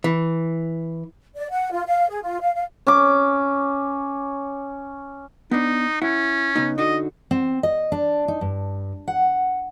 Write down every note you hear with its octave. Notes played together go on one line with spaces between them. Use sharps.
E3
D5
F#5
F4
F5
G#4
F4
F5
F5
C#4 D6
B3 D4 D#4
C#4 E4 F#5
C#3 B3 D#4
D3 D#4 F#4 D#5
C4
D#5
D4
D#4
G2
F#5